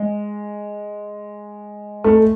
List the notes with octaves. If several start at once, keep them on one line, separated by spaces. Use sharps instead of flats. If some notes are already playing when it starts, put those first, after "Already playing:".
Already playing: G#3
A3